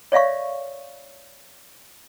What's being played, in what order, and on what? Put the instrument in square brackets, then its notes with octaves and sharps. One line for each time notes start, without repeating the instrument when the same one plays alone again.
[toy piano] C#5 D5 E5 F5 C#6